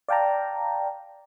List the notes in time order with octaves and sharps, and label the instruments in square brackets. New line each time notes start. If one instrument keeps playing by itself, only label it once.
[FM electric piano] D5 F5 G5 A5 A#5